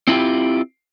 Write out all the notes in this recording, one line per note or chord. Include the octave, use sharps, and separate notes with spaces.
C4 E4 F4 G4